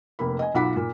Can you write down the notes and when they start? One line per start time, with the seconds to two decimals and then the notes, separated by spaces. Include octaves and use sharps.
0.19 F1 A#3 B5
0.39 D#5 G#5
0.54 B1 F4 F#5 B5 D6 B6
0.76 A#2